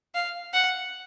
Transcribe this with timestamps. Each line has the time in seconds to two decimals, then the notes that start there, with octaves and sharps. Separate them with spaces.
0.15 F5
0.53 F#5